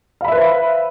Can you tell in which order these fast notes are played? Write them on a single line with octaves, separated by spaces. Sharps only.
F5 B5 E5 B4 C5